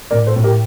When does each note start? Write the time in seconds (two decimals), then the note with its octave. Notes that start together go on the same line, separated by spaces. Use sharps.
0.11 A2 A#4 D5
0.27 A4 C5
0.36 A2
0.44 G4 A#4